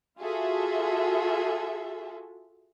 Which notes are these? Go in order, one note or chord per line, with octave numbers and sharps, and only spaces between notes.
F4 F#4 G#4 A4 E5